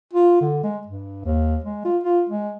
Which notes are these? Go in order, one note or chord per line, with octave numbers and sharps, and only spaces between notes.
F4
D3
G#3
G2
D#2
G#3
F4
F4
G#3